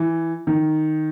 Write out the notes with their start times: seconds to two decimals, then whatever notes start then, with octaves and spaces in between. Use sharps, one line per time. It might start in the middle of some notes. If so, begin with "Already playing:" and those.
Already playing: E3
0.47 D#3